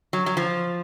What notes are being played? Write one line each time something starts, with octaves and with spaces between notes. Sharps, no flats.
F#3
F#3
F3